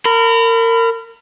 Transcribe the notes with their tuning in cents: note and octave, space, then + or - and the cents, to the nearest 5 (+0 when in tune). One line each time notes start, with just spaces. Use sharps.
A#4 -25 B5 +20